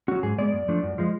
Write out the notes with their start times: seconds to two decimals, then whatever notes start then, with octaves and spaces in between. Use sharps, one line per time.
0.08 F#3 C#4 F#4
0.23 G#2 G#4
0.38 G#3 B3 D5
0.52 F#2
0.68 F3 A3 D4
0.83 F#2
0.98 F3 G#3